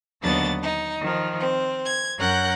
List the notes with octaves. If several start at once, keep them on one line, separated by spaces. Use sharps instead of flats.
D#2 D3 F#3 B3 D4 A6
D#4
D#3 F3
C4
G#6
F#2 C#4 A#4 F#5 F#6 G6